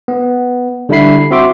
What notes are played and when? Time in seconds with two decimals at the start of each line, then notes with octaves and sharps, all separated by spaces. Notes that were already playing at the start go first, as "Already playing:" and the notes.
0.08 B3
0.89 D3 G3 D4 E4 B5 C7
1.31 C4 F#4 E5 C6 D6